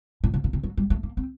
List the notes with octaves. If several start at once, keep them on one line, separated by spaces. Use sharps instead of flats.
A#2
C3
B2
C3
F#3
G3
A3
A#3
C4